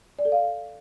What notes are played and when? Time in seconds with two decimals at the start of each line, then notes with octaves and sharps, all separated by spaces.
0.19 D5
0.25 A4
0.32 F5